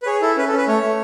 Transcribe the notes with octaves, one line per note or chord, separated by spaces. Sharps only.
B4
G#4 C#5
E4 A4
C#4 B4
A4
C#4
B4
A3 C#5
A3